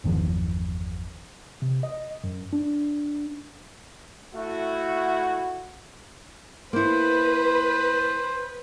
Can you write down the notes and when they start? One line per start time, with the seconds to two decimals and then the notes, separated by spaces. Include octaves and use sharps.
0.04 G1 E2 D#3 F3
1.62 C3
1.83 D#5
2.24 F#2
2.53 D4
4.35 A3 E4 F#4
6.73 A#3 E4 B4 C5